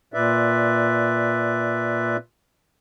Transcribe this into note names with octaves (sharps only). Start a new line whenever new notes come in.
A#2 B4 D5 E5